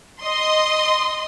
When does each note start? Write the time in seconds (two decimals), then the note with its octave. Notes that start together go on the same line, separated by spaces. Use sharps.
0.22 D#5 C6